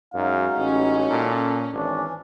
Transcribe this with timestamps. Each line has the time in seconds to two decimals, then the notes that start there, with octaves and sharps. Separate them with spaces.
0.14 F#2 F#3 G#3 D#4 F5
0.57 A1 C#4
1.10 A#2 A4
1.73 G#1 E3 C#4 D4